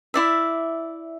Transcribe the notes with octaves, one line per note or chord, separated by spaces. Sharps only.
E4 D5 E5